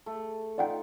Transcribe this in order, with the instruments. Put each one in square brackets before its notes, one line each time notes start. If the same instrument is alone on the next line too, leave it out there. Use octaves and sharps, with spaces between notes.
[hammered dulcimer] A3
[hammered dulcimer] D#4 F4 [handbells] D5 F#5 G5